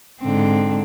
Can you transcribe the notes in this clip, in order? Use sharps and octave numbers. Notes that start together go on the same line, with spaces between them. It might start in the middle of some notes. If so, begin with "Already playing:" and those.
G#2 D3 C4